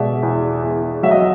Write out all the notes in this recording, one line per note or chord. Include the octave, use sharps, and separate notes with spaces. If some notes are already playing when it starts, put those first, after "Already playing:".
Already playing: B2 G#3 D5 E5
E2
E2
F#3 E5
D#5